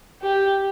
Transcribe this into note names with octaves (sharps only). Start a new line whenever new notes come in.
G4